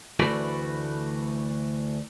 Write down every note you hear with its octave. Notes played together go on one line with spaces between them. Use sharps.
D2 E3 A3 F#4 B4 D5